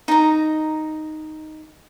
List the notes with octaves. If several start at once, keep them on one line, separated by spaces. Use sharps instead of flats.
D#4 A#5